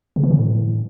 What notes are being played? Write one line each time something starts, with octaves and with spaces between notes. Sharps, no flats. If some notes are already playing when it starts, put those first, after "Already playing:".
C#3
E3
D3
A2